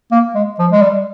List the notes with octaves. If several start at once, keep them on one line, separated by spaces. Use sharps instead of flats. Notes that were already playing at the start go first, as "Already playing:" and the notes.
A#3
G#3
F3
G#3
G3